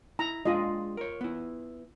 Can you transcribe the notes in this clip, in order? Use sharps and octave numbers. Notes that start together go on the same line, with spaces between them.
E4 A#5
G#3 D4 F4 G#4 D#5
A#4 C#5
B3 E4